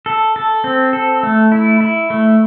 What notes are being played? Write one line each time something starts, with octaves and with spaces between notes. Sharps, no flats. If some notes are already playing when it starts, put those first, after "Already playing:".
A4
A4
C4
A4
A3
E4
E4
A3